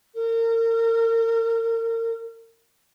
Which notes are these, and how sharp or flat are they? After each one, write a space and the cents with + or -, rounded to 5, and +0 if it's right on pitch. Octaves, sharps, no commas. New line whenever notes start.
A#4 -35